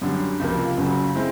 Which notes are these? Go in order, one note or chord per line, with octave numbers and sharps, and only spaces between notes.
F#2 D3 G3
C#2 C3 F3 A#3
F#1 F#2 C#3 F#3
G#3 C4 E4